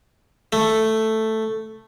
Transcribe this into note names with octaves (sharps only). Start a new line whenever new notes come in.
A3